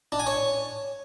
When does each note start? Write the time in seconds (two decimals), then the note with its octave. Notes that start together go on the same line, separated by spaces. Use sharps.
0.12 D4
0.19 G#5
0.27 C#5